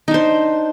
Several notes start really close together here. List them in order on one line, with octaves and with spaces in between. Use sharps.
D#4 D4 C5